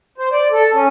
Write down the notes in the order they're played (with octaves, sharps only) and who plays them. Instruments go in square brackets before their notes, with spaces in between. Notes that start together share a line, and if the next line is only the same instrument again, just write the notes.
[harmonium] C5
D5
A4
C#4